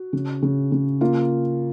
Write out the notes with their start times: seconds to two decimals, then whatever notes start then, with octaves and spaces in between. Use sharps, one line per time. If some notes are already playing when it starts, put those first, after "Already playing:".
Already playing: F#4
0.13 C#3
0.42 C#3
0.72 C#3
1.01 A#3 F4